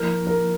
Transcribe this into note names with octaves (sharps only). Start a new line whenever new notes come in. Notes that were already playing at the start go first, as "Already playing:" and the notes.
Already playing: F3 A#3 E4 A#4
A#4